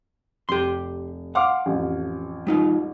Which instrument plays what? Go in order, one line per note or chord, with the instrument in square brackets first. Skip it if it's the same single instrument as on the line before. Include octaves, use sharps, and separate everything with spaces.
[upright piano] F1 [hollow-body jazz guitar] G4 C6
[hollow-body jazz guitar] F5 F#5 [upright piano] C6 D6 F6
[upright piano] A1 F2
[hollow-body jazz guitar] G3 D#4 F4